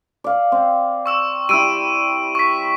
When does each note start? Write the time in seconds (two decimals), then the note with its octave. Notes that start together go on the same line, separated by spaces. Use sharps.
0.24 D5 F5
0.52 C4
1.06 C#6 E6 E7
1.49 G3 E4 E6 D7 D#7
2.35 C#6 B6